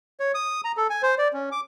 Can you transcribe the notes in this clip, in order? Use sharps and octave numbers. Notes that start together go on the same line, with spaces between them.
C#5
D#6
A#5
A4
G#5
C5
D5
C#4
D6